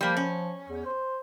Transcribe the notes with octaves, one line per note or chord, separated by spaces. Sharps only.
F3 G3 A#3
C#4
E2
C5